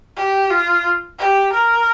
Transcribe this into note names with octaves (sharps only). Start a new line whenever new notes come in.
G4
F4
G4
A#4